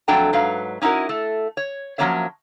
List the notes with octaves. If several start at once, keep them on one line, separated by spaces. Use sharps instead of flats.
F2 F#3 A3 D4 G5 A#5
G#2 F#3 B4 F5
C#4 D#4 E4 F#4 A#4
A3 A4
C#5
F3 F#3 A#3 C#4 C#5 E5